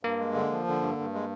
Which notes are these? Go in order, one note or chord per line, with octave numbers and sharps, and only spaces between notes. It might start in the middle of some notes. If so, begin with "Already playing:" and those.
G2 A#3
G#3
D3
F3
D3
G2
G2
G#3